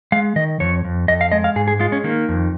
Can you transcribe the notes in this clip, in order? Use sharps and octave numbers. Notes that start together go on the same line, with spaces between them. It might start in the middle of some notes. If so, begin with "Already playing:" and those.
G#3 F5
D#3 D#5
F2 C#5
F2
F2 D#5
F5
G#3 D#5
F5
G#2 G#4
G#4
G#3 F4
C#4
D#3 A#3
F2